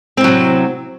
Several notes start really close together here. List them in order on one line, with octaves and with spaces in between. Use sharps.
C4 A2 F#3 C3